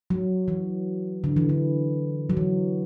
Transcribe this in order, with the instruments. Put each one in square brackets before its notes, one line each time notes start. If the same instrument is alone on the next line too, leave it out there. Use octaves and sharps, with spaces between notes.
[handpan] F#3
E3
D3
E3
D3
F#3
E3